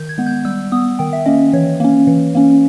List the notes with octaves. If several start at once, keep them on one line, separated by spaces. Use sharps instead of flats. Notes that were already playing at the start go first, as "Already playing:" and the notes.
Already playing: D#3 G6
G#6
G#3 B3
G6
G3 E6
B3 D#6
D#3 G5
E5
A#3 C#4 D#5
E3 C#5
A#3 C#4
E3
A#3 C#4